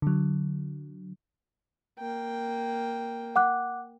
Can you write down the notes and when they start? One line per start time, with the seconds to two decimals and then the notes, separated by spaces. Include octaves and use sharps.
0.02 D3 F#3
1.99 A#3 G5
3.36 F#5 D6 F#6